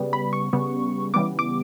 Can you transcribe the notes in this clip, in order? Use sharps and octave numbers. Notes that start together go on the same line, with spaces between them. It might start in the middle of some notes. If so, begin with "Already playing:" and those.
Already playing: C#3 G3 B3
B5
C#6
C#3 G3 B3
C#3 E3 G3 B3 D6
D6